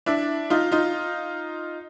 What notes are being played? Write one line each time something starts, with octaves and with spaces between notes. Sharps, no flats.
D4 E4
D#4 F4
D#4 F4